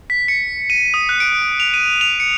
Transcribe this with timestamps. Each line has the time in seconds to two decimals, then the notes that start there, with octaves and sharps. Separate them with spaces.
0.10 B6
0.28 C#7
0.70 D#7
0.94 D#6
1.09 F#6
1.20 D7
1.60 F7
1.74 D#7
2.01 F7
2.20 C#7